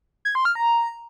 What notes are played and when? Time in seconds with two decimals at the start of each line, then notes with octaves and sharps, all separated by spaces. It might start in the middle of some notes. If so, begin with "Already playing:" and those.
0.25 G#6
0.35 C6
0.45 F6
0.55 A#5